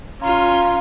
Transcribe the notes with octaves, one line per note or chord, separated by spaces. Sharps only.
C#4 F4 F5 A#5 C6